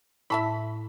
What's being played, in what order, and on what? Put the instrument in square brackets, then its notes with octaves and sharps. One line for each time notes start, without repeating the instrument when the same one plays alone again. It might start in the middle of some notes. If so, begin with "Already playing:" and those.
[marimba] A2 E4 [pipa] E5 A5 B5